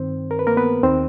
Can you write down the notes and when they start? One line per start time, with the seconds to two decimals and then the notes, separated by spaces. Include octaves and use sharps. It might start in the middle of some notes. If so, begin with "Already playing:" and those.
Already playing: G2 D#3 C4 C5
0.31 A#4
0.39 B4
0.47 A#3 A#4
0.57 B3 B4
0.83 D#2 D#3 C4 C5